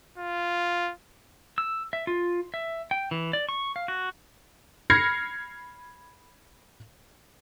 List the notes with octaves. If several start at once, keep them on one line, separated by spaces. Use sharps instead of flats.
F4
E6
E5
F4
E5
G5
E3
D5
C#6
F5
F#4
B5 F6 G#6 A#6 C7 C#7